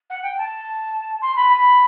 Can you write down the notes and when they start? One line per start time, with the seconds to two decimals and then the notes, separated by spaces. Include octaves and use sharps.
0.10 F#5
0.23 G5
0.38 A5
1.22 C6
1.36 B5
1.49 B5